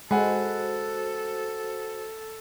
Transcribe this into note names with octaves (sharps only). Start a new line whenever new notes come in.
G#3 F#4 A4 C5 F#5 G#5 B5